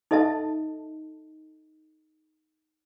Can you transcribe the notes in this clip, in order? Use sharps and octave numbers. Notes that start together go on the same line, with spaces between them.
D#4 A4 D#5 E5 A5